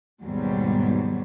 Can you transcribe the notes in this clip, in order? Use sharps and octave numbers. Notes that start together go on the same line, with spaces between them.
D#2 G#2 B2 F#3 G3 B3